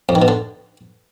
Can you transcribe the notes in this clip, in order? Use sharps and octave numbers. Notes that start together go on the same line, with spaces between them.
F2
D#3
B2
D3